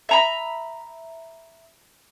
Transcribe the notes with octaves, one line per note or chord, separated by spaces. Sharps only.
E5 A#5 B5